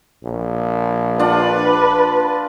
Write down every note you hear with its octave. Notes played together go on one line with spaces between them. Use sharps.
A#1
D4 F4 B4 F#5